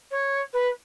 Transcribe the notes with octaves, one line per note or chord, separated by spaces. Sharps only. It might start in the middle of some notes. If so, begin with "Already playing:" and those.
C#5
B4